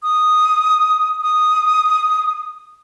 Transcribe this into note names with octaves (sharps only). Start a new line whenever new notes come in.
D#6
D#6